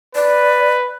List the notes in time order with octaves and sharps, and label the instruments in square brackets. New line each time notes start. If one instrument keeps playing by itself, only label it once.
[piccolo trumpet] B4 [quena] D5